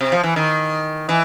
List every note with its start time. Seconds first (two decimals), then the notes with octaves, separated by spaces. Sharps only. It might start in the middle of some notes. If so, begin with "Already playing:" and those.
0.01 C3
0.12 F3
0.23 E3
0.36 D#3
1.09 E3